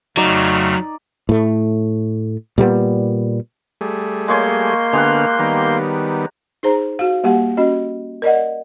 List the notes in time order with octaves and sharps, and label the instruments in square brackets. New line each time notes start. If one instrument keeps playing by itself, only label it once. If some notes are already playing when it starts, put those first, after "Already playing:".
[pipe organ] F2 C#3 A3 [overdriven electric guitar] F#3 [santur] D#4 D5
[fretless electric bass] A2 A3
A#2 G3 A#3 B3
[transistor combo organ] G3 A3 G#4
[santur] G#3 C#5 G#5 [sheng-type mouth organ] A#3 C6 G6
[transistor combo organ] D3 B3 F6 [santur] G#3 G4 F#5
[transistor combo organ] D#3 G3 B3 [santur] A#5
[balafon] D#4 G#4 C5 A#5
F#4 F5
G3 A#3 G4 F#5
C#4 F#4 D#5
A#4 D5 D#5 F#5